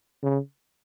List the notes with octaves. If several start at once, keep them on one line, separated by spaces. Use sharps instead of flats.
C#3